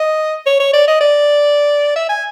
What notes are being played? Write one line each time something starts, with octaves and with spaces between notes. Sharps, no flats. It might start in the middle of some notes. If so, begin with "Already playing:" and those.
Already playing: D#5
C#5
C#5
D5
D#5
D5
E5
G#5